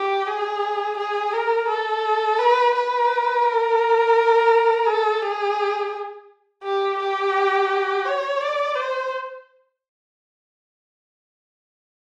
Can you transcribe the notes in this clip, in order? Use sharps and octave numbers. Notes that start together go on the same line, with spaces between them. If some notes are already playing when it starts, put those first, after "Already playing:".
Already playing: G4
G#4
G#4
A#4
A4
B4
B4
A#4
A4
G#4
G4
G4
C#5
D5
C5